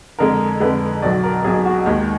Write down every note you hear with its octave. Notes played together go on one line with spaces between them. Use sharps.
F2 D3 G#3 A#4
F2 D3 G#3 B4
B1 B2 F#3 D5
A#4
B1 B2 F#3 G#4
F#4
D#2 D#3 G#3